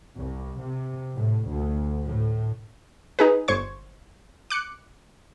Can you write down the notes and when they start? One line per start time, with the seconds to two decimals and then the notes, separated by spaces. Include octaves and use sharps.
0.16 C2
0.63 C3
1.17 A2
1.52 D2
2.04 A2
3.19 D#4 G#4 B4
3.48 G1 C5 C#6 G#6
4.50 D6 F#6 C#7